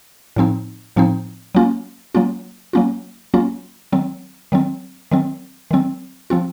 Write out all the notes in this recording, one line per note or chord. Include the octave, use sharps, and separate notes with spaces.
A2 F3 C4 D#4
A2 F3 C4 D#4
F#3 A#3 C#4 F4
F#3 A#3 C#4 F4
F#3 A#3 C#4 F4
F#3 A#3 C#4 F4
D#3 F#3 C4
D#3 F#3 C4
D#3 F#3 C4
D#3 F#3 C4
F3 C4 F4